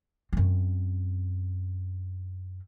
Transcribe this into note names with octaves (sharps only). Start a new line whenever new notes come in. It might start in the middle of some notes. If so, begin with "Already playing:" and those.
F#2 C4